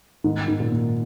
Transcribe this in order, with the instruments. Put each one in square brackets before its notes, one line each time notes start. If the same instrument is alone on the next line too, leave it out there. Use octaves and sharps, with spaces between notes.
[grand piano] G#2 [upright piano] D#3
[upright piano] D#3
[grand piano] A#2
[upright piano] A#3